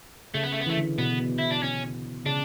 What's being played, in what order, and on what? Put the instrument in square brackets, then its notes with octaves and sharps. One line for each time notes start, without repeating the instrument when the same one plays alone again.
[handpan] C#3 [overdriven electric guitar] A3
[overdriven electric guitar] B3
A3
B3
[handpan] E3 [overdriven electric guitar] A3
[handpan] D3
[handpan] B2 [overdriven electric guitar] B3
[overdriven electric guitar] E4
D4
C#4
[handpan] C#3 [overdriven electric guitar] D4